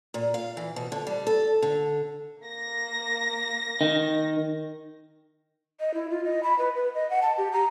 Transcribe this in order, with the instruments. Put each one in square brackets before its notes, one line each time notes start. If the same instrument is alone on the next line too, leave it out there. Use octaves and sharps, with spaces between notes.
[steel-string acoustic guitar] A#2
F5
E3
B2
D3
G3
A4
D3
[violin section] A#3 A#6
[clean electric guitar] D#3
[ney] D#5
E4
F4
D#5
B5
B4
B4
D#5
F#5
A5
G4
A#5